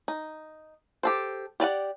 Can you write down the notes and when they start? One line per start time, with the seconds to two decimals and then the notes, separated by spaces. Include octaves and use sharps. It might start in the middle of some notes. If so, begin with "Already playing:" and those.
0.08 D#4
1.03 G4 A4 C5
1.60 G4 D5 D#5 F#5